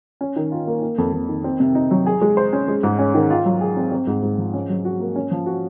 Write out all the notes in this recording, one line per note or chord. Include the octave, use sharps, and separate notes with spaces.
C#4
D#3
F4
A#3
A#3
F2
F2
D#3
C4
C3
D#4
F#3
G#4
G#3
C5
C#4
G#3
G#2
C#4
D#3
F4
F#3
G#4
C4
C4
G#2
G#2
F3
C#4
F#3
F#4
A#3
C#4
F3
F#4